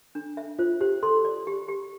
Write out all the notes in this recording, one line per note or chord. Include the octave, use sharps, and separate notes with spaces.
D4
E5
F4 C5
G4 C5
A4 C6
D5
G4
G4